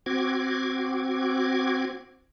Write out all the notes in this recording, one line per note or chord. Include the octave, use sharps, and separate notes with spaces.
C4 F#4 D6 G#6